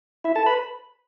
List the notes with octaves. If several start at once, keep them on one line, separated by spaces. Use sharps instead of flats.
E4 E5
A4 A5
B4 B5